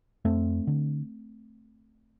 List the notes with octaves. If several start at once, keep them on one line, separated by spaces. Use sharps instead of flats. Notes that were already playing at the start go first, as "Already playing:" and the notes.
F2 A3 C4
D3